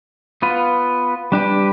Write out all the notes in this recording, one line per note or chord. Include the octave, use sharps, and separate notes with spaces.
B3 F4 B4
G3 D4 G4 B4